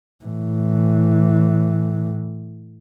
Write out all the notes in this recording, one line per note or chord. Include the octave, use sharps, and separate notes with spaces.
A2 E3